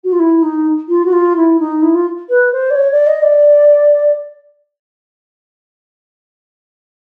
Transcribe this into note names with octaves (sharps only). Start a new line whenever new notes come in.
F#4
F4
E4
D#4
F4
F#4
F4
E4
D#4
E4
F4
B4
C5
D5
C#5
D5
D#5
D5